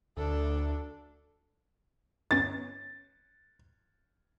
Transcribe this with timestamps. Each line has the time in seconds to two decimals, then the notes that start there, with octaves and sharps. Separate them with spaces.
0.17 D2 D4 A4
2.31 G1 B3 C#4 A6